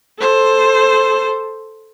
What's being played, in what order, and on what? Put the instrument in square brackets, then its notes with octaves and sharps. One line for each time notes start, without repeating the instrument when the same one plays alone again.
[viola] A4 C5